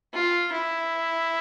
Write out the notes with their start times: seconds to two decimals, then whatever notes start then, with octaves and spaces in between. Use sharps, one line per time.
0.13 F4
0.52 E4